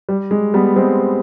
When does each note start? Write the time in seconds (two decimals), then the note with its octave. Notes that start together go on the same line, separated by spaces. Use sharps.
0.09 G3
0.31 G#3
0.54 G3 B3
0.76 G#3 C4